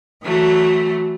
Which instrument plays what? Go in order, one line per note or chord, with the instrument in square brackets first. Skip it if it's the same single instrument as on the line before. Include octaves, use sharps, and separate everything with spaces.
[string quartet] E3 F#3 A3